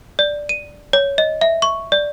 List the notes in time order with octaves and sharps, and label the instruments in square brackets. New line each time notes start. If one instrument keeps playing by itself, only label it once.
[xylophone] D5
D#7
C#5
D#5
E5
C#6
D5